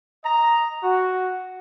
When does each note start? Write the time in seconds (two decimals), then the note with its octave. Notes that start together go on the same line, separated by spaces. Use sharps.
0.24 D#5 A#5
0.83 F#4